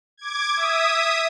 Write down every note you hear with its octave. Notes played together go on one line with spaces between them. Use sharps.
D6 G#6
E5 D#6